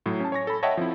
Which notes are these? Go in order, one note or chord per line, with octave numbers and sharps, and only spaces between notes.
A2 F#3
C#4 A5
C#5 G#5 C#6 A#6
A4 B5
C#5 D#5 E5 F#5 G5 A5
F3 C4 E4